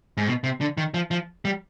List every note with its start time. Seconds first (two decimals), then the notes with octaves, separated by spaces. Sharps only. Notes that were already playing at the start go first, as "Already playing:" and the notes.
0.17 G#2
0.27 B2
0.44 C3
0.61 D3
0.77 D#3
0.94 F3
1.11 F3
1.45 G3